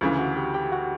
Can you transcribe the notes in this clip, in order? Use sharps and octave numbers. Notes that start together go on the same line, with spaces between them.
D2 C#3 E3 F4 F5
F#4 F#5
G4 G5
G4 G5
F#4 F#5